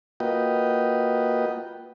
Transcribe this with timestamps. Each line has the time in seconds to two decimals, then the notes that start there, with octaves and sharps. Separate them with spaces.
0.20 A#3 F4 F#4 B4 D#5 G5